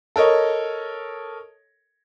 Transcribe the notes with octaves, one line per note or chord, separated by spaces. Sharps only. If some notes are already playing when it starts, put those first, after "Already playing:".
A4 A#4 C#5 D#5